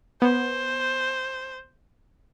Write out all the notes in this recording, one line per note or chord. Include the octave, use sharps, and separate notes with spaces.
B3 C5